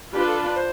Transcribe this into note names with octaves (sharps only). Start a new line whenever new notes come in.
D4 F4 G4 B4
A4
C5